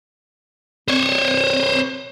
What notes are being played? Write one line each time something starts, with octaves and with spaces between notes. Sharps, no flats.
C4 C5 C#5